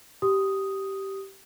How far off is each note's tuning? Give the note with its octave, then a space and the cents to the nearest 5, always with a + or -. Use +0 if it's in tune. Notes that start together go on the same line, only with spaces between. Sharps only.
G4 -15 D#6 +0